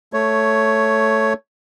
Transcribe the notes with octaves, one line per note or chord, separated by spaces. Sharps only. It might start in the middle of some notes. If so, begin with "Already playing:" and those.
A3 C#5